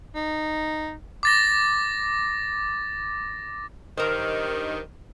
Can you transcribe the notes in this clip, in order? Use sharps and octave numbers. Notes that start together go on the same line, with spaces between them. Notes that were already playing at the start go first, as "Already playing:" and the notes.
D#4
D6 A6 A#6
G2 D#3 A#4 C5